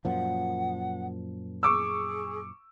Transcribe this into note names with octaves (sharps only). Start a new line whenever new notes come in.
F#2 A#2 F3 F#5
G#4 C#6 D6 E6